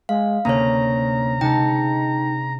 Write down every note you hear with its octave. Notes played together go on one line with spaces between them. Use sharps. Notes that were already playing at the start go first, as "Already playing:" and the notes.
G#3 F5
D2 C3 A#3 C#4 C#5 A#5
C3 G#3 D#4 G5 A5